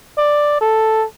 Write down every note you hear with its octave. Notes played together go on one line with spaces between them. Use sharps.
D5
A4